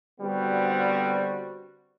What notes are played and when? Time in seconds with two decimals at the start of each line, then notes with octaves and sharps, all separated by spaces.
0.20 D3 G3 B3 C4 F#4